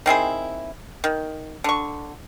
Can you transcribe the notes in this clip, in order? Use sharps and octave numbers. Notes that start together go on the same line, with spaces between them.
D#3 C4 E4 G#4
D#3
D3 C#6